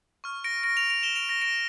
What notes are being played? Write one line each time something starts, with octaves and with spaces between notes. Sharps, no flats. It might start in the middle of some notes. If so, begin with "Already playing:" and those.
C#6 F6
A#6 D7
A#6 D7
D7 F7
D7 F7
E7 G7
D7 F7
A#6
A#6 D7